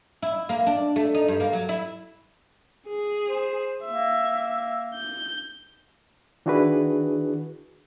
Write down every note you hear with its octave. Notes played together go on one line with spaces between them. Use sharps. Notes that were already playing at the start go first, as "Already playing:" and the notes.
E4
A#3
D4
A3
D#4
G2
A#3
F#3
E4
G#4
C5
A#3 E5
G6
D#3 D4 E4 F#4 G#4 B4